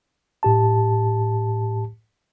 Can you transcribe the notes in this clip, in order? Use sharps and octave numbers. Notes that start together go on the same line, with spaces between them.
A2 G4 A5